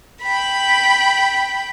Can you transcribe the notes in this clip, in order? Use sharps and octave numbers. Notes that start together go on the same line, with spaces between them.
G5 B5